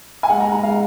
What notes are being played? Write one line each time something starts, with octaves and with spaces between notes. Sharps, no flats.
G#5
G#3 F#5
A#5
G#3
A#5
G#3 F5